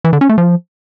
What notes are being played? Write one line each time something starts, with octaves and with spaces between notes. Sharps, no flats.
E3
D3
C#4
A3
F3